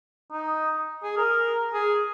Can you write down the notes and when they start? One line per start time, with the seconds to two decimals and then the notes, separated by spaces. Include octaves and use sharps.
0.32 D#4
1.03 G#4
1.17 A#4
1.74 G#4